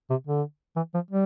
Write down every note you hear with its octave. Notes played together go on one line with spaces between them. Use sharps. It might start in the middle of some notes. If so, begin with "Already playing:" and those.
C3
D3
E3
F3
G3